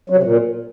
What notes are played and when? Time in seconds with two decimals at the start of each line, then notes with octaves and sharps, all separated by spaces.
0.10 F#3
0.16 C3
0.23 A#2